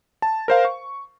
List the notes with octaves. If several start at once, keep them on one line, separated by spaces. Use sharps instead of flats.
A5
A#4 C5 F5
C#6